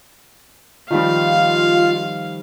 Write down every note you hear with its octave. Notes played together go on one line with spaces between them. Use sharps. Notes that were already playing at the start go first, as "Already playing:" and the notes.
D#3 F3 G3 F4 F5